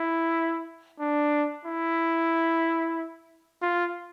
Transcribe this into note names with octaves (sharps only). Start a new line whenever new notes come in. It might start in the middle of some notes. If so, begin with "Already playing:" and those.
Already playing: E4
D4
E4
F4